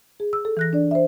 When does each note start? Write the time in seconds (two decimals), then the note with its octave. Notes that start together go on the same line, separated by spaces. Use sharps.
0.20 G#4
0.33 E6
0.45 A4
0.57 E3 F#6 A#6
0.73 D4 D5
0.91 C5 E5